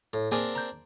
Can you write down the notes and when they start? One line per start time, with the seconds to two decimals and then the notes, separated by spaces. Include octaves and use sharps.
0.13 A2
0.31 A#3 C4 D4 G#4 A#4 G#5
0.56 A#5 G6